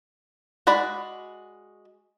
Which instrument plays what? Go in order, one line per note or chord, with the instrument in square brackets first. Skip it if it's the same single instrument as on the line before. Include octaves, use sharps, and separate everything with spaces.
[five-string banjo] G#3 F#4 D5 B5